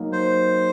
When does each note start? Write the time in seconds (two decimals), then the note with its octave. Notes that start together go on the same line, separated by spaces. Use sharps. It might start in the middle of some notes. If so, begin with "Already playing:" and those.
Already playing: F#3 A#3 D#4 A#4
0.13 C5